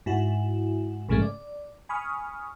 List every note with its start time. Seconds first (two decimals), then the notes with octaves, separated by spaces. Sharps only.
0.06 G#2 E4 F#4
1.09 A#1 G#2 C#3 F3 G#3 A3
1.22 D5
1.89 G#5 B5 C#6 D#6 F6